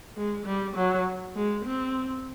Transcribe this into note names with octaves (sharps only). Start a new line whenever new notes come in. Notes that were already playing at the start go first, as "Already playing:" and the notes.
G#3
G3
F#3
G#3
C4